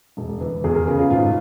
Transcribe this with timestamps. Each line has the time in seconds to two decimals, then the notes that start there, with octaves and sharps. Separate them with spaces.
0.17 E1
0.41 E3
0.64 E2 G#4
0.75 A#4
0.87 C#3 G#4
0.98 F4
1.10 G#1 F4